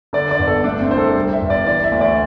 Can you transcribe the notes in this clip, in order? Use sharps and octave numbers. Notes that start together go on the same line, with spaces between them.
D3 D5
D5
G1
A4
A3 D4
C4
C2 C5
A4
G3
E5
G1
D5
E3 D5
E5
D2
D5